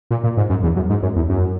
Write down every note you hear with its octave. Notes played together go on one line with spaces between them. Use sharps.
A#2
A#2
G#2
F#2
E2
F#2
G#2
F#2
E2
F#2